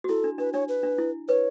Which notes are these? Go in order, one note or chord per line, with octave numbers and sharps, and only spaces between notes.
F#4
E4 A4
D4
D4 B4
D4 C#5
B4
D4
E4
B4 C#5